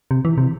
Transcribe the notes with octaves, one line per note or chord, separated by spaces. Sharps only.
C3
E3
C3